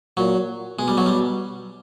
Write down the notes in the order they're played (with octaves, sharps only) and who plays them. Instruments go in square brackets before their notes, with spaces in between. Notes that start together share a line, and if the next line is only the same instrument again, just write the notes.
[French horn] A#2 [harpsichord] F#3
[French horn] B2 [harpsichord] G#3
[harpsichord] G3
F#3
G3